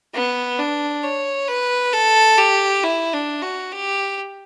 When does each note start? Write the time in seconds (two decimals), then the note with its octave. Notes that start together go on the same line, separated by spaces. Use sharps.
0.14 B3
0.59 D4
1.03 C#5
1.48 B4
1.93 A4
2.38 G4
2.83 E4
3.13 D4
3.42 F#4
3.72 G4